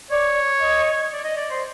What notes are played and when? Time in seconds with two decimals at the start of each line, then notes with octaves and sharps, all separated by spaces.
0.11 C#5 D5
0.61 D#5
1.12 D5
1.24 D#5
1.37 D5
1.50 C5